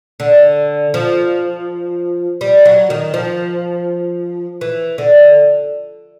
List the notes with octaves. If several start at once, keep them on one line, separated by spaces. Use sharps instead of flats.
D3
F3
G3
F#3
D#3
F3
E3
D3